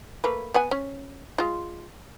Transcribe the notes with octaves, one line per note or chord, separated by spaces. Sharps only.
A3 A#3 B4
B3 F#5 G#5
C#4
G#3 F4